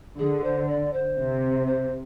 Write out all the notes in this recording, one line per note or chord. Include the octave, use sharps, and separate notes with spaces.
D3 G#4
C5
D5
C5
C3
C5